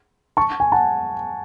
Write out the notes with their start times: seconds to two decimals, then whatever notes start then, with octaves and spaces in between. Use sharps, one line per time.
0.37 A5 C#6
0.60 G#5
0.72 F#5 A5